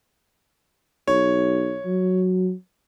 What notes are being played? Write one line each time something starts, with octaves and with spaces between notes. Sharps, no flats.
B1 C#5
F#3